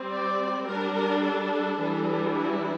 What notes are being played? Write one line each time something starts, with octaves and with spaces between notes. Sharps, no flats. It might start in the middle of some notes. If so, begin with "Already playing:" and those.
Already playing: G3 C4
D5
G3 D4 A#4
A#4
A4
E3 G3 D4
E4